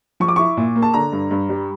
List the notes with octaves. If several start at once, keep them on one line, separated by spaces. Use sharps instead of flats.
F3 C#6
D6
E4 C#6
A#2
A#3
A5
D3 A#5
G2
G2
G3